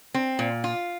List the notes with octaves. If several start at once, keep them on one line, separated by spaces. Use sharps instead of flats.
C4
A#2
F4